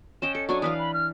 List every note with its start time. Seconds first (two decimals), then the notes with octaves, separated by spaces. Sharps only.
0.22 C#4 D#5 G5 E7
0.35 A4 C#7
0.49 F#3 D4 G#5 C#6
0.62 E3 B4 F5 D#6
0.79 B5
0.94 F6